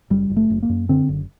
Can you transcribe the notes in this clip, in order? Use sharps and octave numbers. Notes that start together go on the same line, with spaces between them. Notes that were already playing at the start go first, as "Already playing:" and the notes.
F#1 G3
F#1
A3
F#1
A#3
F#2
D3 C4
F#1